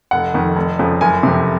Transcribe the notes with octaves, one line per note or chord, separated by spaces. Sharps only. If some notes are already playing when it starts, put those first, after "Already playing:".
F1 F#5
F2 D#3
F1
F2 C#3 F3
F#1 G#5
F2 C3